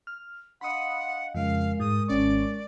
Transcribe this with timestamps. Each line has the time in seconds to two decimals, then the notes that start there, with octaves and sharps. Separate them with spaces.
0.07 F6
0.61 D4 D#5 F5 F#5 B5 C6 D#6
1.35 F2 C#3 G#3 A#4 F5
1.80 G#2 D#6
2.08 G#1 C#4 D5 C#6